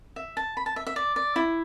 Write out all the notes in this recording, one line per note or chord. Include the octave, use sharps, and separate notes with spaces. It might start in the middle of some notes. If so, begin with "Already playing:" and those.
E5
A5
B5
A5
E5
E5
D5
D5
E4